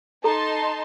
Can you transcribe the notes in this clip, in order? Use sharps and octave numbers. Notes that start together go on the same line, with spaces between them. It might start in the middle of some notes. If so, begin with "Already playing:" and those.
D#4 A4 A5 A#5 C6